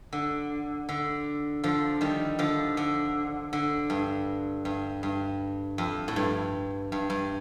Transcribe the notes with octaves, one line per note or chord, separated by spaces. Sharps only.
D3
D3
D3 F3
D#3 G3
D3 F3
D3
D3
G2
G2
G2
F2
A2
G2
G2
G2